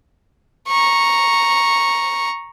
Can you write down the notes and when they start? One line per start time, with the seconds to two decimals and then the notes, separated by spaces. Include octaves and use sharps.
0.68 A#5 C#6